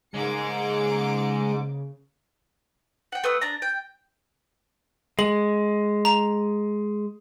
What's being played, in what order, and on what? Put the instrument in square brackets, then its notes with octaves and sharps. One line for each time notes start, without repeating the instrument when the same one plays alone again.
[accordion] G#2 [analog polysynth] C#3 [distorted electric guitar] G#3 [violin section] A#3 D6 C#7
[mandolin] F#5 G5
A3 B4 D#6 E6
D4 A#5
G5
[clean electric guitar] G#3 [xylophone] F#7
[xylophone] A#5 E7 F7